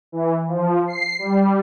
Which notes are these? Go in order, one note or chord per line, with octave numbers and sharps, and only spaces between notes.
E3
F3
C7
G3